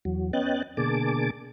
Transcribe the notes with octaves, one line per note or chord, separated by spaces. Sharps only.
E2 F#3
B3 C#4 D#5 G5 F#6 A6
B2 D3 A#3 G#4 A5 D6